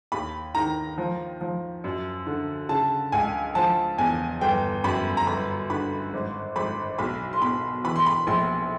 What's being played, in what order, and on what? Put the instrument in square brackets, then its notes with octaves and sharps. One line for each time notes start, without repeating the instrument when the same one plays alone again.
[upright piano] D#2 B5
D#3 A#5
F3
F3
F#2
D3
C#3 A5
C#2 G#5
F3 A5
E2 G#5
G1 G5
F#2 B5
A#5
G1 B5
D3 B5
G#1
G#1 B5
B1 B5
C6
B2 B5
E3 B5
C6
B5
A#1 C6